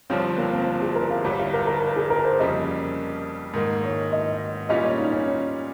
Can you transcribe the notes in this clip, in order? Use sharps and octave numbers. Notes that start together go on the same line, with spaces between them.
G1 G2 F3 C4 C#4 F4
C#4
A#3
C4
C4
G#4
A#4
F5
G1 G2 G3 C#5
F5
A#4
A#4
A#4
G#4
A#4
C5
F2 C#3 G3 A#3 D#5
G#2 D#3 A#3
C#5
D#5
A#2 G3 C#4 F4 D#5
C#5
D#4
C#4
C#4